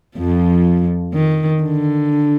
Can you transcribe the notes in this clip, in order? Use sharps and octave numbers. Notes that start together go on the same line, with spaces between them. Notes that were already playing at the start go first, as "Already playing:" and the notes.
F2 F3
D#3
D3